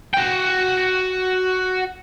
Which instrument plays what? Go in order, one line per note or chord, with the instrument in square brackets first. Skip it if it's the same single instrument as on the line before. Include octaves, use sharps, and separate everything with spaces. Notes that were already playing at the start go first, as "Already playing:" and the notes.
[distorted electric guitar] F#4 G5